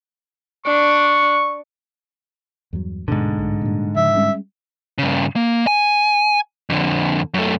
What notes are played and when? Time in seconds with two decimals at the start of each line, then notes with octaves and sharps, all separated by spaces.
0.66 D4 C#6
2.73 E2 G2 F#3
3.08 D1 D2 G#2 B2 D3
3.39 B1 A2
3.62 G2 A#2
3.96 C#3 F3 E5
4.15 G3 G#3 C#4
4.98 G2 C#3
5.36 A#3
5.67 G#5
6.70 F2 D3
7.34 F#2 A3